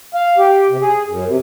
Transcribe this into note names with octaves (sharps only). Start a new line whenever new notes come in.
F5
G4
C3
G#4
F#2
C3